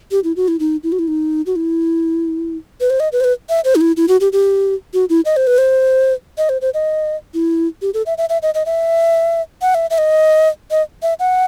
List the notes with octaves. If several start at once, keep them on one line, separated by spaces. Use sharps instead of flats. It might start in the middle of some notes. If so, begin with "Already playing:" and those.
G4
E4
F#4
E4
D#4
E4
F#4
E4
D#4
F#4
E4
B4
C5
D#5
B4
C5
B4
E5
C5
D#4
E4
E4
F#4
G4
G4
F#4
E4
D#5
C5
B4
C5
D#5
C5
C5
D#5
E4
G4
A4
E5
E5
E5
D#5
D#5
E5
F#5
E5
E5
D#5
D#5
E5
F#5